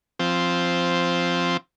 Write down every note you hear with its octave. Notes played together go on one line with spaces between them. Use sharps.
F3 C4